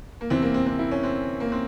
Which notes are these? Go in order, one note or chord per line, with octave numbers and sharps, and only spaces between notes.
A#3
E2 C3 E3 C4
A#3
C4
C4
E4
C#4
C4
A#3
C4